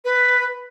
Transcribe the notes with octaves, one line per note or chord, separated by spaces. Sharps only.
B4